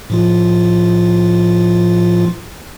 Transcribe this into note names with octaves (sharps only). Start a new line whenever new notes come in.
A2 F3 F4